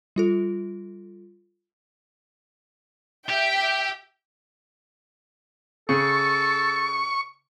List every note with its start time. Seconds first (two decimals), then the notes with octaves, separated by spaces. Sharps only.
0.16 G3 F4 A4
3.29 G4 E5 G5
5.89 C#3 A4 C#6